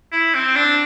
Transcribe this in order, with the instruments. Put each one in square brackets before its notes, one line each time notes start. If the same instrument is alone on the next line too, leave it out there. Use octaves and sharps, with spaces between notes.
[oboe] E4
C4
D4